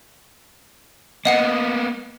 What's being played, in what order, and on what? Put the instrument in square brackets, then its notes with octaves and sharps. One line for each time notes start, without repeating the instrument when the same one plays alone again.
[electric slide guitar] A#3 B3 [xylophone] D#5 F#5 C#7